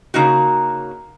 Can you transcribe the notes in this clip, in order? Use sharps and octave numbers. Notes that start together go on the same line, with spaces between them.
C#3 A#3 D#4 F#4